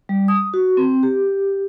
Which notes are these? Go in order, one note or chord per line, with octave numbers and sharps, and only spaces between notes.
G3
D#6
F#4
C4
G4